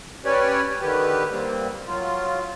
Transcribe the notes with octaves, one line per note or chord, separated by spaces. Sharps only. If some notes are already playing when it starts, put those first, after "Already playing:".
C#4 G4 B4 C#5 D5 G#5
D3 D#3 G4 B4
G3 A#3 C4
F#3 F4